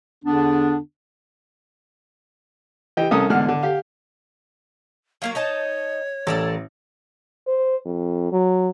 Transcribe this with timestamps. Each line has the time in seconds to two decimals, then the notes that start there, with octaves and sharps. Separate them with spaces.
0.24 E2 D3 B3 D4
2.97 E3 G4 D#5 G5
3.11 C2 C#4 A4 A#4 D#6
3.30 E2 G#2 D3 F#5 F6
3.49 D3
3.63 G4 F5
5.22 F#3 A#3 A#4 F5
5.35 D#4 C#5 D#5 A5
6.27 A1 A4 A#4 D5
7.48 C5
7.85 F2
8.32 F#3